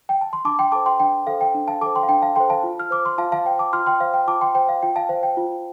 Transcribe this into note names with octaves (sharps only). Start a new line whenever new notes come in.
G5
A5
C6
D4 A5 D6
G5 C6
A4 C5 A5 D6
G5 C6
D4 G5
A4 C5 F5
G5
D4
F5 A5
A4 C5 A5 D6
G5 C6
F5
D4 G5
F5 A5
A4 C5 G5 C6
F5 A5
F4
F6
C5 D6
C6
F4 F5 A5
F5 A5
C5 G5
A5 D6
F4 C6 F6
G5 C6
C5 F5
G5
F4 A5 D6
G5 C6
C5 G5
F5
F4 G5
F5 A5
C5 F5
G5
F4